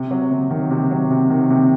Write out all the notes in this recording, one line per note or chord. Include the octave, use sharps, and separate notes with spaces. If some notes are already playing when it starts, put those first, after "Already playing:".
Already playing: C3
F#3
C3
D#3
C3
F#3
C3
D#3
C3